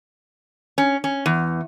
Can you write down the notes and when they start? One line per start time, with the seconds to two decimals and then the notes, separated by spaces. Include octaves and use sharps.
0.78 C#4
1.04 C#4
1.26 E2